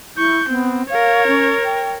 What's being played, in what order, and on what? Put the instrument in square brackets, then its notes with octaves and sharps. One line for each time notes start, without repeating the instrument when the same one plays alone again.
[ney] E4 [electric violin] C#6 G6
[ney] B3 [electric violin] C4
[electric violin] A#4 C#5 [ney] F5
[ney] C#4
G5